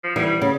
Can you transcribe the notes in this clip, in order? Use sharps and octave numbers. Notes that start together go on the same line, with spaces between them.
F3
E3 G3
C#3